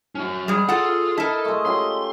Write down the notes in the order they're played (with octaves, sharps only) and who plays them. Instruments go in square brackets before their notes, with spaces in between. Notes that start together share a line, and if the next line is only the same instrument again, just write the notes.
[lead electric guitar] C#4 F#4
[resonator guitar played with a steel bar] G3 G#3 [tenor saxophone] G#4
[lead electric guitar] F4 C6 [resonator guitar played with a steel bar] A4 F#5
[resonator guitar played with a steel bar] E4 A#4 [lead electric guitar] A4 A5 [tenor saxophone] D#5
[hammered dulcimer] G#3 A3
[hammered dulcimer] C#4 F4 G4 [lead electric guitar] C6